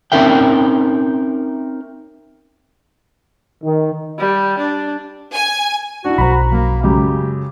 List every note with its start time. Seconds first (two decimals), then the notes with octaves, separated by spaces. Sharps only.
0.12 C4 C#4 D#4 A#4 E5 G5
3.64 D#3
4.19 G3
4.59 D4
5.33 G#5
6.05 D4 E4 F#4
6.18 B1 F#2 C5 A#5 B5
6.51 F#2 A#3
6.83 F#2 C#3 G#3 G4